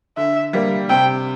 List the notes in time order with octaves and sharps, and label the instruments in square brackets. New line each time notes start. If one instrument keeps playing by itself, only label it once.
[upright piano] D3 [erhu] E5
[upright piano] G3 A#3
[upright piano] C3 [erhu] G5